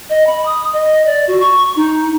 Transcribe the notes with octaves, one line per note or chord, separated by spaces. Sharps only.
D#5
B5
D#6
D#5
D5
F#4
C#6
D#4